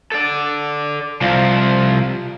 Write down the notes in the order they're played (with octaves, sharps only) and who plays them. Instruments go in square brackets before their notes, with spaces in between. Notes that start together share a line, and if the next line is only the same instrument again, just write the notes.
[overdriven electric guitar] A4 D5
[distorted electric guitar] C2 [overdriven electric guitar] F3